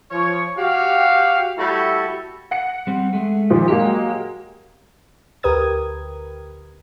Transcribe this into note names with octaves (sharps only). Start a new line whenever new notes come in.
F3 C#5
F#4 G4 F5
G3 A3 E4 F#4 A4
F#5 C#7
G3 C4
G#3 A3
A#2 D#3 F3
F#3 G#3 A#3 G4
D2 G4 A#4 B4 D#6 G#6